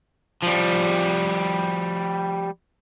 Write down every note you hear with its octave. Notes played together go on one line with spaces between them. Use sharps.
F3 G3